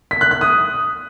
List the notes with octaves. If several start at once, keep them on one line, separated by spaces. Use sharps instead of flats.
B6
F#6
F#6
D#6